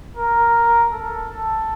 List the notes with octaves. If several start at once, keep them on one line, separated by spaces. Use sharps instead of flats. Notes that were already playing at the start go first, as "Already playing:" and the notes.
A#4
A4